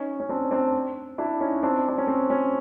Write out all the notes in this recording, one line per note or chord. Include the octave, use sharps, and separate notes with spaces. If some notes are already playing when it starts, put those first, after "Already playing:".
Already playing: C#4 D#4
C#4
C4 D4
C4 D4
D4 E4
C#4 D#4
C4 D4
D4
C#4
C4
C#4